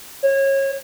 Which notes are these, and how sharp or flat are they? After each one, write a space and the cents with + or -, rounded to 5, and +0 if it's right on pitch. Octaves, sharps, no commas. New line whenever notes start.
C#5 -25